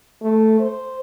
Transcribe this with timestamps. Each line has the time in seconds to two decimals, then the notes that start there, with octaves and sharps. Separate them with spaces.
0.22 A3
0.60 C5